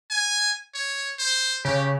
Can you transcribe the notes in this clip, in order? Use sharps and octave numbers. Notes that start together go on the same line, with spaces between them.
G#5
C#5
C5
C#3 G4